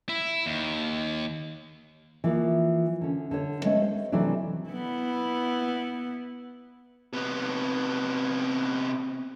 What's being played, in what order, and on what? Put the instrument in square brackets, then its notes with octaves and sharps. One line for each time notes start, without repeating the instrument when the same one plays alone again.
[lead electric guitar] E4
D#2
[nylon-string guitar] E3 F3 A#3
D3 C#4
D3 C#5
G#3 A3 B3 C#4
C5
C3 E3 F#3 A3 D4
[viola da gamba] B3 E4
[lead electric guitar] C3 B3